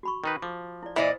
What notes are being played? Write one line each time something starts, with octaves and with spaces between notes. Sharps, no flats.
F#4 B5 C#6
D#3 D#4 B4
F3 D6
E4 D5
A#2 E3 B4 C5 D5 D#5